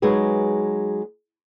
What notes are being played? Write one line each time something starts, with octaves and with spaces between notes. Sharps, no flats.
F#3 G#3 D#4 G#4 B4